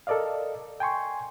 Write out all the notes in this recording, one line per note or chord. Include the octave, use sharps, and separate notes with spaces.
A4 A#4 D5 D#5 F5
G5 G#5 C6 C#6